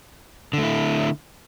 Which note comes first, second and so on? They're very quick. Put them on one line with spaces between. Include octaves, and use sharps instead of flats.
D3 A3 E4